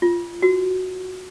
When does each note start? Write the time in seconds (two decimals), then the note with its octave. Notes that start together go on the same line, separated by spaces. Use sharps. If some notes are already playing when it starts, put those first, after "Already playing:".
0.02 F4
0.42 F#4